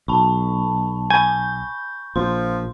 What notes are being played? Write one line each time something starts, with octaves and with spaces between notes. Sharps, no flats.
B1 A5 B5 C#6
G#5 B5 C#6 G6
A#1 F3 C6